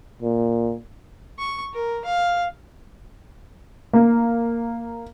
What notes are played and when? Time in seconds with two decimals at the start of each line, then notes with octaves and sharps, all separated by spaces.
0.22 A#2
1.39 C#6
1.74 A#4
2.05 F5
3.93 A#3